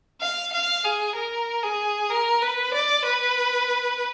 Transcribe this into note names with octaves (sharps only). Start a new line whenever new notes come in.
F5
F5
G#4
A#4
G#4
A#4
B4
D5
B4